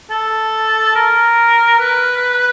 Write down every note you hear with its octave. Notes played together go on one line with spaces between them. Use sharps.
A4
A#4
B4